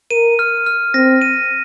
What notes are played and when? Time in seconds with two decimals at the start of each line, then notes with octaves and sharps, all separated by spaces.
0.11 A#4 D#7
0.39 F6
0.66 F6
0.94 C4 A#6
1.22 D#7